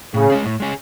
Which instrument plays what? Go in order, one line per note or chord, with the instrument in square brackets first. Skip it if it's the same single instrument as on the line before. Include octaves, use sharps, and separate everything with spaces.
[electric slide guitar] A2 [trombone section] C#3
[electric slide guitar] G#3 C#4 G#4
A2
G#3 C#4 G#4